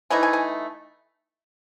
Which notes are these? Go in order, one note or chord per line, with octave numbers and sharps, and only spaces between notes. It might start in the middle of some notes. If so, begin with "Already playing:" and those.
E3 A3 D#4 G#5
G#5
G#5